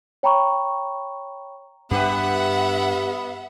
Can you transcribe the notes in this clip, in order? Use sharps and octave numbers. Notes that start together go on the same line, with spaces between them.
C#5 G5 A#5 B5 C#6
G2 B3 D4 G4 B4 E5 F#5